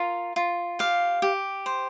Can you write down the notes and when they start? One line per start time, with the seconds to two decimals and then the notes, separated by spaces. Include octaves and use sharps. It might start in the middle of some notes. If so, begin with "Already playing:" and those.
Already playing: F4 A#4
0.36 F4
0.79 G4 F5
1.22 G4
1.66 C5